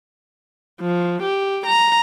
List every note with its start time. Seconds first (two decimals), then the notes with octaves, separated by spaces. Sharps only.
0.81 F3
1.23 G4
1.66 A#5